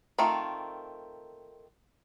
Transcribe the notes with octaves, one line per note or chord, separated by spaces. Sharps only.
D#3 A3 C4 F4 A#4